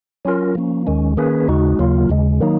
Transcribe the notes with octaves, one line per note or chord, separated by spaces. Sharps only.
F#3 C#4 F4 A#4
F3 A#3 C#4
D#2 D#3 G#3 C#4
D#3 A#3 C#4 G#4 B4
D#2 C#3 G#3 D#4 F#4
D#2 C#3 F#3 A#3 F4
D#2 C#3 G#3
D#3 F#3 A#3 D#4